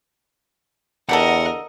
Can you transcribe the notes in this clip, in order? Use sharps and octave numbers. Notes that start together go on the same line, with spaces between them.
E2 D3 G4 A4 A#4 D#5 F#5